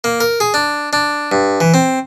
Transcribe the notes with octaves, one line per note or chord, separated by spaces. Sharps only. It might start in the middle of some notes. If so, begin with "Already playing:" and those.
A#3
A#4
G#4
D4
D4
G2
E3
C4